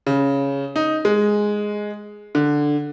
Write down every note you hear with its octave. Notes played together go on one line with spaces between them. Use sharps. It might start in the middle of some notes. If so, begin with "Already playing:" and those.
C#3
D#4
G#3
D3